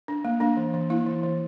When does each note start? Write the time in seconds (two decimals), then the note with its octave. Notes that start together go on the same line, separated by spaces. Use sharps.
0.08 D4
0.25 A#3
0.40 A#3 D4
0.57 E3
0.74 E3
0.90 A#3 E4
1.06 E3
1.23 E3